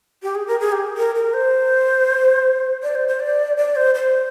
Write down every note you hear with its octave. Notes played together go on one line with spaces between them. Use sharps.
G4
G#4
A#4
G#4
G4
A#4
A#4
C5
D5
C5
C5
D5
D5
C5
C5